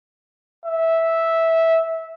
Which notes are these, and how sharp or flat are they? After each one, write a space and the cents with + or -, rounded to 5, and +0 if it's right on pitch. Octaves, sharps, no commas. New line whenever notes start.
E5 -10